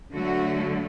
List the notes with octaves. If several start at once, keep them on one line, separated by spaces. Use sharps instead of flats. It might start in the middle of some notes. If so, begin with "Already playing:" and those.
D3 F#3 A3 F#4